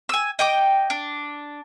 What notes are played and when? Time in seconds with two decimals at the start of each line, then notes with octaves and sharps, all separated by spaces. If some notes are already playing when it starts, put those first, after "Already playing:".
0.09 G#5 E6
0.39 D#5 G5 D6
0.90 D4